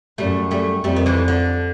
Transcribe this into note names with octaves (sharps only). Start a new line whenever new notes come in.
F#2 G3 A3
G3 A3
F2 G3 A3
D#3
D3 E3
D3